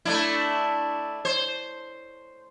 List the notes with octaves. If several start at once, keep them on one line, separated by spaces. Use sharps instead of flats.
A3 D4 E4
C5